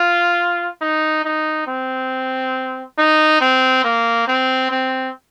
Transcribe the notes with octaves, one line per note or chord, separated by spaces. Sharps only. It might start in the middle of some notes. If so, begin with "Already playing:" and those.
Already playing: F4
D#4
D#4
C4
D#4
C4
A#3
C4
C4